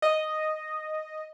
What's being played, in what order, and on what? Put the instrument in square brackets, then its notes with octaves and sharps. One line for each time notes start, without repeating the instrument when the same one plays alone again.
[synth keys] D#5